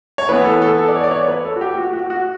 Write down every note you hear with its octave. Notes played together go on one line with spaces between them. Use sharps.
C#5
E3 B3 B4
A4
A4
A4
D5
C#5
D5
C#5
B4
A4
F#4
G4
F#4
F#4
F#4